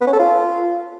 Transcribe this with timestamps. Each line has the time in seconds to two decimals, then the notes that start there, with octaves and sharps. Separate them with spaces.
0.01 B3
0.07 C#4
0.13 A4
0.19 F4